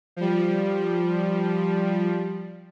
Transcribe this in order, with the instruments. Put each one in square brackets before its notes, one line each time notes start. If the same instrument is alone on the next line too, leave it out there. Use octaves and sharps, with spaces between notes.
[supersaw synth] F3 G3